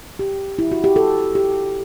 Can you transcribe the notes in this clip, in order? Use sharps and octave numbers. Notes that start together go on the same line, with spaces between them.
G4
E4
F#4
G4
A4
G4